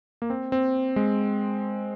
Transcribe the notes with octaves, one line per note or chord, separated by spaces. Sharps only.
A#3
C4
C4
G#3